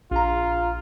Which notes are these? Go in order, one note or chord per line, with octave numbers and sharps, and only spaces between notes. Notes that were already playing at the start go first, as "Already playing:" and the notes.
A#1 F4 A#5